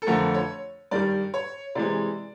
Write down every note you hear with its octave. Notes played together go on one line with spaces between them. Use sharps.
A4
F2 D3 F3 A3 A#4
C#5
G2 D#3 G3 D5
C#5
C3 E3 G#3 D5